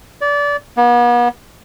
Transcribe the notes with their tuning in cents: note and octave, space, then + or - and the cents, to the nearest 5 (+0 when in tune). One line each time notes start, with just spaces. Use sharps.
D5 -25
B3 -40